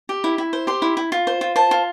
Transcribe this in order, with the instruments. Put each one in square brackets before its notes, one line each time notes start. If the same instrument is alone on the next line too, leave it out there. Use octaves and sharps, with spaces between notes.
[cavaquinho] G4
E4
E4
C5
G4 C6
E4
E4
F4
C5
F4
C5 A5
F4